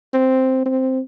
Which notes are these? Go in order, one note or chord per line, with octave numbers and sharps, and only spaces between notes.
C4
C4